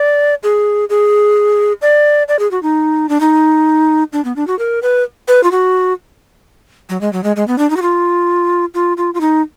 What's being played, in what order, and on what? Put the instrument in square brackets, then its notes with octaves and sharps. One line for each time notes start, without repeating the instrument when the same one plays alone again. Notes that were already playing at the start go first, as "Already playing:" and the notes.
Already playing: [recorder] D5
G#4
G#4
D5
D5
G#4
F#4
D#4
D4
D#4
D4
B3
D4
F#4
A#4
B4
B4
F4
F#4
F#3
G#3
F#3
G#3
G#3
B3
D4
D#4
F#4
F4
F4
F4
F4
D#4